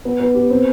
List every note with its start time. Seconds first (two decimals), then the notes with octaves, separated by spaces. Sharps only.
0.05 B3
0.20 B3
0.35 G4
0.50 C4